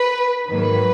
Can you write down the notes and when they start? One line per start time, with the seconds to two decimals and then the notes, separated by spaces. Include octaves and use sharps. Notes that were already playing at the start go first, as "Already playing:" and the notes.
Already playing: B4
0.50 G#2 D#3 F#3 A#3 B4